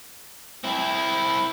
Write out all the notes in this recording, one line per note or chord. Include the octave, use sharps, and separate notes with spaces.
C4 E4